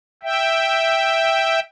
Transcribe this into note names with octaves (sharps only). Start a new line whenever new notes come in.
E5 G5